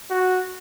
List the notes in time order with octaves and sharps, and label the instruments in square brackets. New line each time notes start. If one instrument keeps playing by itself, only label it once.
[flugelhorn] F#4